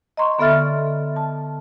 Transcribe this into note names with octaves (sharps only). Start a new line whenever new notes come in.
D#5 A#5 C6 C#6
D3 B3 A4 E5 F6 A6
A5